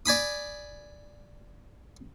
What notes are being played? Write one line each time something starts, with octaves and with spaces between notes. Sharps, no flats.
D5 G#5 B5 D#6